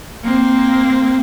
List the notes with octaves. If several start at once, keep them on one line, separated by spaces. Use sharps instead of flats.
A#3 C4